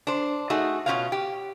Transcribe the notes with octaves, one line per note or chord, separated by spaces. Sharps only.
D4 C5
A3 D#4 F#4 G#4
B2 F3 C#4 F4 F#4 F5
G4